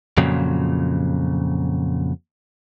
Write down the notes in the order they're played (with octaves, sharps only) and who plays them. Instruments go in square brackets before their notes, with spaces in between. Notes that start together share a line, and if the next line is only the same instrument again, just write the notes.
[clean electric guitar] F2 A#2 C#3 F#3